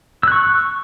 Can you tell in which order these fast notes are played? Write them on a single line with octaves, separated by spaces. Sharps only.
E6 F#6 C#6